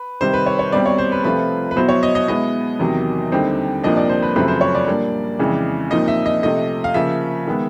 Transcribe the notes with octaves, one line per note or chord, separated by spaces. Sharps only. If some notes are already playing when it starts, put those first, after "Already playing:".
Already playing: B4
C3 D#3 G3 C5
B4
C#5
C#5
C2 B2 G3 C4 D5
C#5
C5
B4
C3 F3 A3 C4 F4 B4
B4
B2 F#3 B3 E4 C5
C#5
D#5
D#5
B2 G#3 B3 E4 D#5
E2 C3 D#3 F#3
D#2 D3 G3 C4 D#4
C2 A#2 F3 A#3 D4 D#5
D5
C5
B4
F#2 C#3 F3 A3 C4 B4
C5
C#5
D5
A#2 G3 A#3 D4
F2 C#3 E3 G#3
C2 A#2 F3 A#3 D#4 D#5
E5
D#5
C3 F3 A3 D#5
F5
C#3 F3 A#3 E5
D#3 G#3 B3